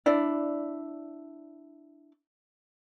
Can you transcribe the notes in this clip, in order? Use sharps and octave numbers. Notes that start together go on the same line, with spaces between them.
D4 E4 D5